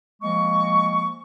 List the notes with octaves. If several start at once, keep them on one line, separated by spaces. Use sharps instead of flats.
F3 G#3 A#3 C#6